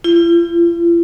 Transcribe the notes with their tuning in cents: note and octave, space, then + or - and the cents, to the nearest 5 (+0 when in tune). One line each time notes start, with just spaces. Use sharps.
F4 -45